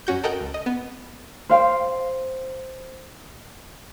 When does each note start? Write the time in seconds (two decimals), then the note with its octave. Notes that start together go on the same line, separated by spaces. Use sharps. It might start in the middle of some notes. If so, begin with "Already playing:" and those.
0.07 F#2 C#4 F#4 G6
0.23 A4 A#4 D#5 F#5 G5
0.41 C#2
0.54 D#5
0.66 B3
1.49 C5 F5 G5